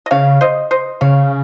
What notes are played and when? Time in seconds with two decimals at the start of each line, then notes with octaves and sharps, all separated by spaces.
0.06 D#5
0.11 C#3 C#5 F5
0.41 C5 D#5
0.71 C5 D#5
1.01 C#3 C#5 F5